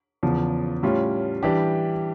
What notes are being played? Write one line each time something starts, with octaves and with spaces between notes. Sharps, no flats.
E2 C#3 F3
A2 G3 C#4 F4
E3 G3 D4 G4